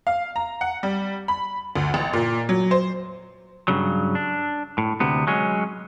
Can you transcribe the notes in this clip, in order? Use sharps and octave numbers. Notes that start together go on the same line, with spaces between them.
F5
A#5
F#5
G3
B5
D2
A1
A#2
F#3
C5
G2 C#3 F#3
D4
A2
D2 C3 B3
F#3 G#3 C#4